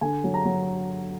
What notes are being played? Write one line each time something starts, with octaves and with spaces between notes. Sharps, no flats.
D3 G#5
F#3
A#5
F#3